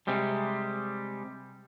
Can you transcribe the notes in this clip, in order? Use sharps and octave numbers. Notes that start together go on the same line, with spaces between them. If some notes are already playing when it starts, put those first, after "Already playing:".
C3 G3 G#3